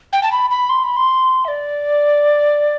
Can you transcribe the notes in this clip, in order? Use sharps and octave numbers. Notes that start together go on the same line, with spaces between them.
G5
A5
B5
B5
C6
B5
C6
E5
D5